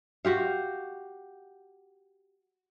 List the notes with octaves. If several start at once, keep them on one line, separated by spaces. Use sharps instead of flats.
F#4 G4 F5